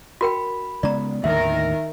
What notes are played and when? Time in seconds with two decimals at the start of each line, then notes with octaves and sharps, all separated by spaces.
0.21 F#4 A#4 G5 B5
0.83 C#3 G#3 B3 D5 A#5
1.24 D#2 A2 D3 D#3 A#4 E5